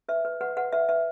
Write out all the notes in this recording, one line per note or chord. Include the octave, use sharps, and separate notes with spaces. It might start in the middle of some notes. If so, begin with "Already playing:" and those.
B4 E5
B4
B4 F#5
B4 F#5
B4 E5
B4 E5